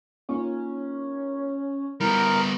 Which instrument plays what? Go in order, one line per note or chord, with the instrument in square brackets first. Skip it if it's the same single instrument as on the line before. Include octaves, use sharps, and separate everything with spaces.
[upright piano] A#3 D#4 F4 [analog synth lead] C#4
[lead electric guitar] G3 B3 [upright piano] E4 [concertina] A#4 [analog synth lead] B5